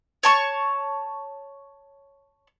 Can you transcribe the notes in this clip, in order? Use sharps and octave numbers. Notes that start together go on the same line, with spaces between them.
C#5 A5 C#6